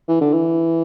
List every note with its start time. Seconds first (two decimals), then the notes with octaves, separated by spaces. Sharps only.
0.08 E3
0.21 D3
0.33 E3